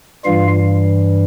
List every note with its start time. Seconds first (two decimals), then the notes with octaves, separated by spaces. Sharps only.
0.25 G2 E3 G3 F4 F5